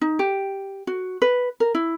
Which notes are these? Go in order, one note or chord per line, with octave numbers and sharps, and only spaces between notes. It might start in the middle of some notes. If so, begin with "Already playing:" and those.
D#4
G4
F#4
B4
A#4
E4